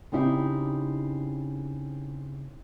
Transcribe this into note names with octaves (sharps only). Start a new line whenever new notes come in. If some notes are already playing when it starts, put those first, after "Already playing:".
C#3 C4 D#4 E4 G4